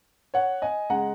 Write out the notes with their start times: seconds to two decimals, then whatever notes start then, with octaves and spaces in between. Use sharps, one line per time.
0.34 C#5 F#5
0.62 D#5 G#5
0.90 C#3 G#3 F#5 A#5